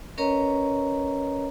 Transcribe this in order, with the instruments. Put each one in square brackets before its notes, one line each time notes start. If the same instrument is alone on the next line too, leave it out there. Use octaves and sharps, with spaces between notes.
[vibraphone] C#4 A#4 B4 C#5 D#5 A#5